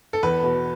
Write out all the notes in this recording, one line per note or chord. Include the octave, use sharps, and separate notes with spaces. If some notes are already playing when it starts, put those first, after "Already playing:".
A4
E2 B4
B2